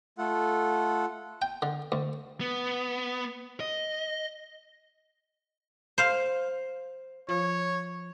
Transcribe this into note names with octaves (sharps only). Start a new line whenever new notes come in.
A3 F4 A4 F#5
G5
D3
D2
B3
D#5
C5 F5
F3 C#5